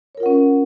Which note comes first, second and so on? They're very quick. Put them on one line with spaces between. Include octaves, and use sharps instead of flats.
C#5 A#4 F4 F#5 C#4